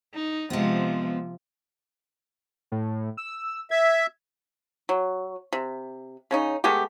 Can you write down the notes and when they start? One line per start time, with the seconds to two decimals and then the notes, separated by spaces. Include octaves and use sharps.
0.14 D#4
0.50 C3 F3 G#3 B3
2.72 A2
3.17 E6
3.71 E5 G#6
4.89 F#3
5.53 C3
6.31 C#3 C#4 D#4
6.64 G#3 A3 B3 G4